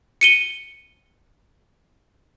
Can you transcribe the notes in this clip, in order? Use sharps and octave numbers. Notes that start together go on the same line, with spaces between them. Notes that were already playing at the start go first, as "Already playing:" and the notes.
C#7 D#7 G7